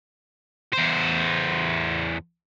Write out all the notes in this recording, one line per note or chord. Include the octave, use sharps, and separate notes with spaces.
E2 C5